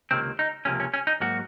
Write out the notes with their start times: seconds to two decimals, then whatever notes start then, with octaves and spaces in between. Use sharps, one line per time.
0.11 C#2 C3 D#3 A#3 C4
0.39 D#4
0.65 C#2 C3 F3 A#3 C#4
0.80 C#4
0.94 C#4
1.07 D#4
1.20 G#2 F#3 A#3 F#4